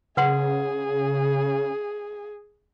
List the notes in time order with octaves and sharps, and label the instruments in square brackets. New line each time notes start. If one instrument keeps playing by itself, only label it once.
[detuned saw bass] C#3 [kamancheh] G#4 [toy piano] B4 F#5 C6